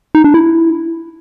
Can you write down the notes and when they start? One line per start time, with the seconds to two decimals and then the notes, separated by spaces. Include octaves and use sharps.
0.15 D#4
0.24 D4
0.34 E4